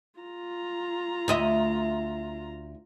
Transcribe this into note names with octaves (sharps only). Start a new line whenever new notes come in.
F4 A#5
D2 D#5 E5